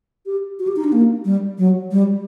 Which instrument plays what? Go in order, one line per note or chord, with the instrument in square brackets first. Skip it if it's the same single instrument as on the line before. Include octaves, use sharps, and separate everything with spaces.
[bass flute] G4
F#4
G4
D#4
D4
A#3
G3
F#3
G3